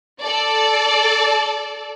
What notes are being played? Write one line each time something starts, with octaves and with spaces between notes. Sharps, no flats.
A4 D5